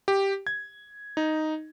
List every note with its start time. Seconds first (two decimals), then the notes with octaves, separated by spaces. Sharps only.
0.08 G4
0.47 G#6
1.17 D#4